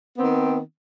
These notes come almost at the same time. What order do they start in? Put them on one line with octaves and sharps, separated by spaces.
B3 C4 D#3